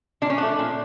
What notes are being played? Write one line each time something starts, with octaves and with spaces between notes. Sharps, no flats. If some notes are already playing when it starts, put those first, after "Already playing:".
A#2 D4
C#4
F3 A3 D4
A#2